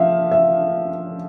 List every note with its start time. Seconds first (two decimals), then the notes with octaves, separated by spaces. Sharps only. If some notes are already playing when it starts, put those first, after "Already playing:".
Already playing: F3 E5 F5
0.32 E5